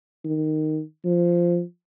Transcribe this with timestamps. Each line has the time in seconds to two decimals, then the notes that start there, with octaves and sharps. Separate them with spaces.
0.24 D#3
1.05 F3